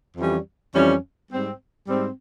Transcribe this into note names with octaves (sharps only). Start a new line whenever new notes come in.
F2 E3 G3 C#4
F2 E3 G3 C#4
G#2 G3 C4
G#2 G3 C4